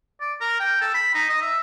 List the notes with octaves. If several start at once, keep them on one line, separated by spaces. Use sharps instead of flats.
D5
A#4
G5
A4
B5
D#4
D#5
E5